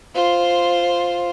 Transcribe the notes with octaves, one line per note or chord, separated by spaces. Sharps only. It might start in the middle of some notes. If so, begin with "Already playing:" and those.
F4 C5